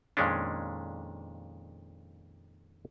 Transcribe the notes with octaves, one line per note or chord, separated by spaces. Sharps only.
F2 A#2 D#3 G#3 C#4 D4